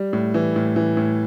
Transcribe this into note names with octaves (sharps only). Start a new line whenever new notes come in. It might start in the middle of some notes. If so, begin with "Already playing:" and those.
Already playing: G3
A2
E3
A2
E3
A2